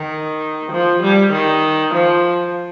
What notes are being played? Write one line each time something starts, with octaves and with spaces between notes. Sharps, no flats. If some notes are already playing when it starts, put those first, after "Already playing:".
Already playing: D#3
F3
G3
D#3
F3